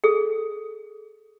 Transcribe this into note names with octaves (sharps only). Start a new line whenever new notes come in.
G#4 A4